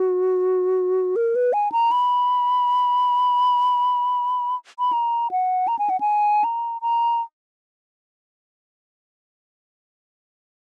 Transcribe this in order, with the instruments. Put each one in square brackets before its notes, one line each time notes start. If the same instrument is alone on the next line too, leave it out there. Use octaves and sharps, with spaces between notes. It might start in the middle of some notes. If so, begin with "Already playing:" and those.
Already playing: [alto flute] F#4
A#4
B4
G#5
A#5
B5
B5
A#5
F#5
A#5
G#5
F#5
G#5
A#5
A#5